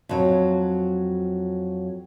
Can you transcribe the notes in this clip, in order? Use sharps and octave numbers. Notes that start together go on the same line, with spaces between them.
F2 F#3